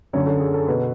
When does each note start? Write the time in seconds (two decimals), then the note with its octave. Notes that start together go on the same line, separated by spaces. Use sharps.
0.13 F#2 D3 C#5
0.26 A4
0.40 G#4
0.54 A4
0.68 B2 B4